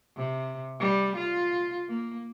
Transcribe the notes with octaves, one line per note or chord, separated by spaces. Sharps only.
C3
G3
F4
A#3